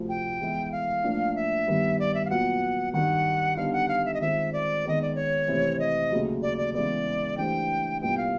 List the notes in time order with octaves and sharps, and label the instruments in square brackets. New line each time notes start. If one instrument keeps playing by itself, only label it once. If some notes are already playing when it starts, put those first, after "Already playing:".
Already playing: [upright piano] D2 C3 F3
[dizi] G5
[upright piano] E3 G#3 B3 E4
[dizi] F5
[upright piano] A2 F3 A#3 D4
[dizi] E5
[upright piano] G2 D#3 G3 B3
[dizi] D5
E5
F5
[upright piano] A#2 F#3 B3 [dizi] F#5
[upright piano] G2 D#3 G3 [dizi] F#5
[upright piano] D3 G3 B3 D#4 [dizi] F5
[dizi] F#5
F5
E5
D#5
[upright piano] D#3 G#3 C4 F4 [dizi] E5
[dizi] D5
[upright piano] D#3 G#3 B3 [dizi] D#5
[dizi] D5
C#5
[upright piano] C3 E3 A3 C4
[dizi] D#5
[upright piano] D#2 C#3 F#3 A3
[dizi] D5
D5
[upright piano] C#3 E3 G#3 B3 [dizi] D5
[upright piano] E3 A3 D4 G4 C5 [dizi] G5
[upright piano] C2 A#2 G3 B3 E4 [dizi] G5
[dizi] F5